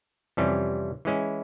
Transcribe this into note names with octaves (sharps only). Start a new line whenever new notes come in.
F2 C3 E3 G3 C#4
E3 G#3 C#4 E4